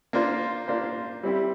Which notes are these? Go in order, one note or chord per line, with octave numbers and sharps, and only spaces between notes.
A#3 D4 F4 C5
A#3 D4 F4 C5
G3 C4 E4 G4